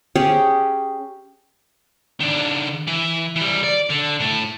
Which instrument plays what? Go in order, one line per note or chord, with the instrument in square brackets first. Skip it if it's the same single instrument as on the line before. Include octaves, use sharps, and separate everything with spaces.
[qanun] C#4 G4 G#4
[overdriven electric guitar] D#3 D4
E3
E3 G3
D5
D3
A2 A3